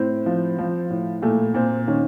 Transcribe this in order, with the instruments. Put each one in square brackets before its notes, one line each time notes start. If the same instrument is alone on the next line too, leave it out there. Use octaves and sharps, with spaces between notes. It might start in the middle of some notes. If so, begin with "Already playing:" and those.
Already playing: [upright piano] A2 C4
F3
F3
A2
A#2 A3
A#2 C4
D#3 C#4